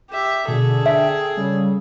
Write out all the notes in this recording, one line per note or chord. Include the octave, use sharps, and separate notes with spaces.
G4 E5
B2 D3 G#4 A4
E5 G5
C#3 G3